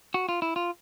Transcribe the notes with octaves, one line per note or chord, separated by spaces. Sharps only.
F#4
F4
E4
F4